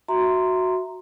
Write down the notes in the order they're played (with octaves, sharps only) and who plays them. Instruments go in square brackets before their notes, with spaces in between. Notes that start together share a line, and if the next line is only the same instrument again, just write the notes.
[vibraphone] F#4 E5 A#5 C6